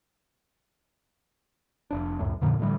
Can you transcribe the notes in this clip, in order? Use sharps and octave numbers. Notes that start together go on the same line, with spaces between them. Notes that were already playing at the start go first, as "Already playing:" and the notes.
F1 D4
C#2 F#2 A2
F2 A#2 D3 D#3
A2 D3 E3 G3